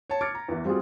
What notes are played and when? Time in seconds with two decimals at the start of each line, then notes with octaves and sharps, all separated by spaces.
0.10 C#5 A5
0.21 D6 F6 G#6 A6 C#7 D7
0.35 A#5
0.49 E2 E3
0.65 G3 C4 F4 F#4 G#4